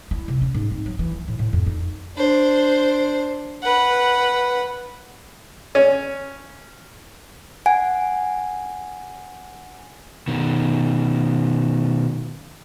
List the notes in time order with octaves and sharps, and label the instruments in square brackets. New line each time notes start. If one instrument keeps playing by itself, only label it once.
[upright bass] E4
C3
C#4
G#2
C4
F#3
E3
A#3
A2
A2
F2
D#4
[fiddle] D4 C5
B4 F#5
[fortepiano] C#4
[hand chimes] F#5 G#5
[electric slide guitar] B2 D#3